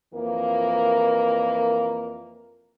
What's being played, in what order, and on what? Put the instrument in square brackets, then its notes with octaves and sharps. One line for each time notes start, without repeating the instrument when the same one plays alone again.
[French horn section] F2 E3 A#3 A#4